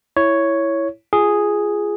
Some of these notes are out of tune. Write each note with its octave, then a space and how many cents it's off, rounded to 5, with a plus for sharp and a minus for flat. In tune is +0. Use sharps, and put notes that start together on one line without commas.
E4 +0 C#5 +0
F4 -15 G#4 +0